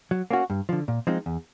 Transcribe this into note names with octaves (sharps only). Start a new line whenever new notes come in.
F#3
A#3 C#4 F#4
G2
D3 F3
A#2
F3 G#3 C4 D#4
E2